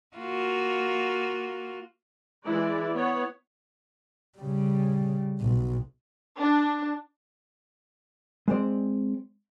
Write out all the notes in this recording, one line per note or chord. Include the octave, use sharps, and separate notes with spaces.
A#3 F4 F#4
E3 G#3 E4 D5
B3 C#5
C#3 G3
B1
D4
G#3 C4 C5 D5